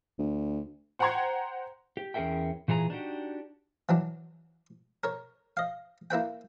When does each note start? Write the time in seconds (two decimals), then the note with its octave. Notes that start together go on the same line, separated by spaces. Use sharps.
0.19 D2
0.99 C5 F#5 G5 A#5 C6 G#6
1.97 G4
2.14 E2 C#4 G#4 A#4 E5 G5
2.68 A#2 E3 G#4 A#4 A#5
2.90 D4 D#4 F#4 G4
3.89 E3 F#3 D4
5.04 A#4 C#5
5.57 D#5 F5
6.10 A#3 E4 B4 G5